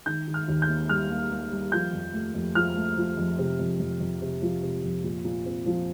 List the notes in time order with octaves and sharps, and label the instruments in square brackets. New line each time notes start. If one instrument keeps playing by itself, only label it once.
[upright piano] D#3 G6
D#3
F6
D#2
G6
A#3
G3 F6
A#3
A#3
G3
F3 G6
F2
A3
F2
F3 F6
A3
F3
F2
C3
F2
F2
F2
C3
F3
C3
F2
A#2
A#2
C4
F3